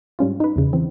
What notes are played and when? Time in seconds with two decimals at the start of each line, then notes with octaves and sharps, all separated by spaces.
0.19 G#2 G3 C#4 F4
0.40 D#4 B4
0.56 E2 C#3
0.73 E3 C4